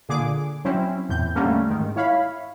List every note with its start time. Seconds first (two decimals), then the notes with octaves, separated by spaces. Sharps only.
0.09 A#2 D3 G#4 D6
0.65 F#3 C4 C#4 E4
1.09 E2 A2 G6
1.35 D3 G3 A3 A#3 C#4
1.69 G#2 D#3
1.96 E4 C#5 F5 B5